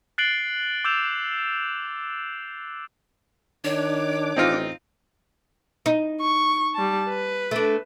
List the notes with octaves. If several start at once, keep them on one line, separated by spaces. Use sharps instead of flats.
F#6 A6 C7 D7 F#7 G7
D6 E6 G6 E7 F7
D#3 D4 C#5 D6
A1 C4 D#4 F4
D#4
C#6
G3 A5
B4
A3 D4